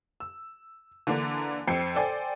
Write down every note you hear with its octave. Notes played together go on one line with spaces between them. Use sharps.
E6
D3 E3 A#3 D4
F2 C4 G5 C7 C#7
A4 C5 D5 G5 G#5